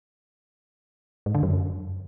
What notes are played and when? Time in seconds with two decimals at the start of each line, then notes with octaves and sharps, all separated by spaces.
1.26 G#2
1.35 D3
1.43 F#2